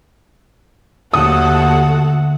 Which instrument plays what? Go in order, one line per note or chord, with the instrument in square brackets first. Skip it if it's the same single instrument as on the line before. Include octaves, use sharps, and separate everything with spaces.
[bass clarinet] D#2 [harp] D3 A3 [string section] F#4 A4 F#5 [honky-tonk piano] D#6